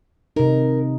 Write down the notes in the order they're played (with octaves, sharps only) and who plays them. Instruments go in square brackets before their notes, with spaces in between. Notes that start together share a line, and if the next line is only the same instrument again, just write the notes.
[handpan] C3 D#4 [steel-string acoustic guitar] A#4